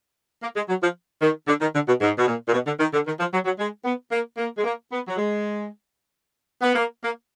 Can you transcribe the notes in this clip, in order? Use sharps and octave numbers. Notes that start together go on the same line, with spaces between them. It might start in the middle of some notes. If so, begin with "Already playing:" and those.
A#3
G#3
F#3
F3
D#3
D3
D#3
D3
B2
G#2
B2
A#2
A#2
B2
D3
D#3
D3
D#3
F3
F#3
F#3
G#3
B3
A#3
A#3
G#3
A#3
B3
F#3
G#3
B3
A#3
A#3